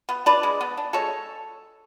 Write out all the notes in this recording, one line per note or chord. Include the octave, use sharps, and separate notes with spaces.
B3
D4 B4 D5
G#3
B3
D4
G#3 A4 C#5